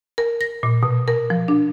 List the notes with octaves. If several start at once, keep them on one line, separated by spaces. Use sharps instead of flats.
A#4
A#6
A#2
B2
A#4
F3
D4